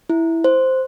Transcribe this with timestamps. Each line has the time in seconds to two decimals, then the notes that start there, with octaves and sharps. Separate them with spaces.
0.10 E4
0.44 C5